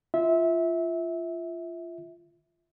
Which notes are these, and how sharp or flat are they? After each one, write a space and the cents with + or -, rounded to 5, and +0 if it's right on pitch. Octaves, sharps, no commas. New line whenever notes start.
F4 -20 E5 -20